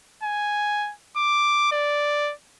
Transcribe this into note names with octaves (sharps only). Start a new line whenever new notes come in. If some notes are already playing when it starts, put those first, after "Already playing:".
G#5
D6
D5